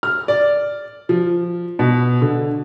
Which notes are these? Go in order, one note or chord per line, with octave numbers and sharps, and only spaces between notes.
F6
D5
F3
B2
D3